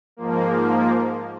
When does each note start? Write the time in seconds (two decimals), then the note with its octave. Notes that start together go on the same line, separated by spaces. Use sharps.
0.17 G#2 F3 A#3